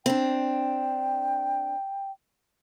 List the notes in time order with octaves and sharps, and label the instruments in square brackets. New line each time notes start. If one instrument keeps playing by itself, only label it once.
[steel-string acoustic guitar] C4 D4 [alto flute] G5